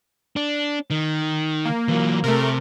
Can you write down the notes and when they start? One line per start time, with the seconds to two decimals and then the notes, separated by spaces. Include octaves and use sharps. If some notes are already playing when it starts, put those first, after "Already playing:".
0.36 D4
0.90 D#3
1.65 A#3
1.88 E3 F#3
2.24 C3 A3 A#4